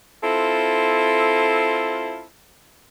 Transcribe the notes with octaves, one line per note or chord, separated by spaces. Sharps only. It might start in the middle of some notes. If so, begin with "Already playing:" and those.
C4 E4 F4 A4